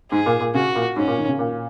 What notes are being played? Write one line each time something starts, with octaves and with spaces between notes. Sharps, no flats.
G#2 G#4
A#2
A#2
C#3 F#4
A#2
G#2 C#4
A#2
D#3
C#3
A#2